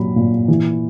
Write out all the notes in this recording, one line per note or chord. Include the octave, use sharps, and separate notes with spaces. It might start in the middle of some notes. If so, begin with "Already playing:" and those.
Already playing: A#2 F#3 B5
A#2
E3